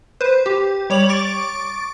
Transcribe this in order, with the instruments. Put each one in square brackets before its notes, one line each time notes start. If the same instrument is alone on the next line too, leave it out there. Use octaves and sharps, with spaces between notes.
[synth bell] B4 C5
G4
G3 C#5 D6 F7 F#7
C#6 D6 A6 D7